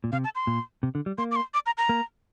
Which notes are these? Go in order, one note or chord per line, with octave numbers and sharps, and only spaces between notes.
A#2
C3 F5
A5
C6
A#2
C3
D3
G3
A#3 C6
D6
C6
D6
A#5
A#5
A#3